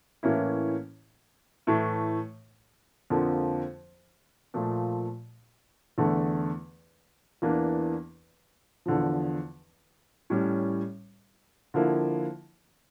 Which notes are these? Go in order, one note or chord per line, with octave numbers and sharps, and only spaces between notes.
A2 E3 A#3 C#4 E4
A2 E3 A3 E4
F2 D3 F3 A#3
A#2 F3 A3
E2 D3 A3
E2 E3 A#3 D4
E2 D3 F3
A2 G3 C#4
D3 F3 A#3 E4